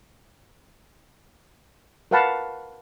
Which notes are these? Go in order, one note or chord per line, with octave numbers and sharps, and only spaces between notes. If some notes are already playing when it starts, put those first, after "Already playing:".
A#4 B4 F5 F#5 A5 B5